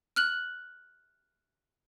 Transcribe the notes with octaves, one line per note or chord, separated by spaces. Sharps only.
F6 F#6 F#7